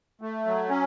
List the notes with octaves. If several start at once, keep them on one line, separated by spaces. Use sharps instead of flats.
A3
F#3
C#4